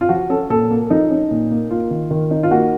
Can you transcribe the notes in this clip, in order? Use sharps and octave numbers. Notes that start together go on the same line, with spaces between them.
F4
F3 F#4
C#4 A4
A#2 A4
A#3
F3 D#4
C#4
A#2
A#3
A#3 F4
D#3
D#3
D#4
F4
A#3 F#4